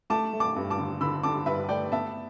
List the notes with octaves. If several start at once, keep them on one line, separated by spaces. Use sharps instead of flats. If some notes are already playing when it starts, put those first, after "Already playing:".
A3 A5 D6
A3
A5 D6
G2
A5 D6
D3
D3 B5 E6
D3 A5 D6
G2 B4 E5
A3 D5 G5
B3 E5 A5